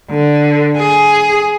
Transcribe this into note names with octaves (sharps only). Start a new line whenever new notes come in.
D3
G#4